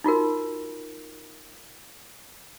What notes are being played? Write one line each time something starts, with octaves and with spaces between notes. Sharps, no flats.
D#4 F4 F#4 A#4